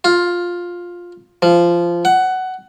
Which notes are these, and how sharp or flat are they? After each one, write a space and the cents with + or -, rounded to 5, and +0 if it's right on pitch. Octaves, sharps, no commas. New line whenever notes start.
F4 +10
F3 -15
F#5 +15